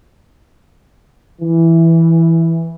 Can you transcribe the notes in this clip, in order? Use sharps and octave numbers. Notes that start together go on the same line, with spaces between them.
E3